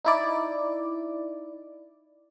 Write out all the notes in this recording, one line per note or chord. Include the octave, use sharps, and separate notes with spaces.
D#4 E4 D5